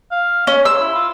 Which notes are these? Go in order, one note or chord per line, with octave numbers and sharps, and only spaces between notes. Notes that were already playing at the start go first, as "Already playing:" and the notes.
F5
C#4 C#5
C5 E6
E4
F4